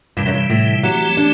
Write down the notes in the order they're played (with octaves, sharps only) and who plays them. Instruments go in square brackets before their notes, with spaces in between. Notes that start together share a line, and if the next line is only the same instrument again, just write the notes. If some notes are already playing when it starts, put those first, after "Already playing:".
[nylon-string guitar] G2 [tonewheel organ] C3 E3 G3
[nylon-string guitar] F#2
G2
A2
[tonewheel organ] E3 A3 C4 G4 [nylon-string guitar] F#3
[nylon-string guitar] D4